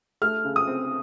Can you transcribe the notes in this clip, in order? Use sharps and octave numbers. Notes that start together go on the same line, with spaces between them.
A3 F6
C#3
D#6
C4